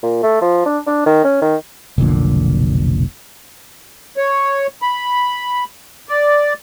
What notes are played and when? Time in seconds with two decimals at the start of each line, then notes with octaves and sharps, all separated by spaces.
0.03 A#2
0.23 A3
0.42 F3
0.66 D4
0.87 D4
1.06 D#3
1.24 C#4
1.42 D#3
1.98 F1 B1 A#2 D3
4.17 C#5
4.82 B5
6.09 D5